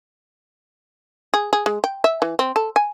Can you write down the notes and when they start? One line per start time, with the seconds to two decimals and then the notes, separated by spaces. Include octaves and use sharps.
1.34 G#4
1.53 G#4
1.66 G#3
1.84 G5
2.04 E5
2.22 E3
2.39 C4
2.56 A4
2.76 G#5